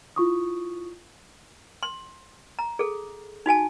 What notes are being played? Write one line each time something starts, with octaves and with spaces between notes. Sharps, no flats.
E4 F4 C#6 D#6
C6
A#5
G#4 A4
D#4 F#4 G#5 A5